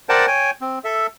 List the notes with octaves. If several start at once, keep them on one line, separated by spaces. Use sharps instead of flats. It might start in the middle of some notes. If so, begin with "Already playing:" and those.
A#4 C5 D5 F#5 G5 A5
C#5 G5 G#5
C4
A4 E5